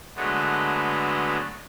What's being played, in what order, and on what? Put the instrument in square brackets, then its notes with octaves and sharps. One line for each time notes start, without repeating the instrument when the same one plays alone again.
[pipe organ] D3 F#3 G#3 A3 B3